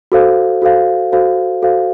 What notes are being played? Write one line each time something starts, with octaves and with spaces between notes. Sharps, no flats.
F#4 A4 C5 F5
F#4 A4 C5 F5
F#4 A4 C5 F5
F#4 A4 C5 F5